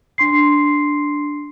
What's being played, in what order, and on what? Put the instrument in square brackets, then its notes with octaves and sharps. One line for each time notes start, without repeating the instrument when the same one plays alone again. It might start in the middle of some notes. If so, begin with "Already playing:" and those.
[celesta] D4 C6 C7